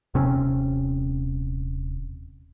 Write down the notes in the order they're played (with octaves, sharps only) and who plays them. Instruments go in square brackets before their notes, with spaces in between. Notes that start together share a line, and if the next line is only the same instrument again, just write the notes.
[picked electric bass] D#1 C3 C4 C#4